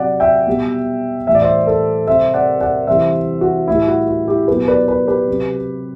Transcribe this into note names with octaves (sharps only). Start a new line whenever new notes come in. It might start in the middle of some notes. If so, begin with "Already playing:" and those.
Already playing: C3 F#3 D5 F#5
E5 G5
B2 G3
A2 E3 G3 E5
D5
C5 E5
A4 C5
C3 G3 C5 E5
D5 F#5
D5 F#5
C3 E3 G3 C5 E5
F#4
A2 G3 E4
F#4
F#4
E4 G4
B2 F#3 G4 B4
B4 D5
B4 D5
G4 B4
C3 F#3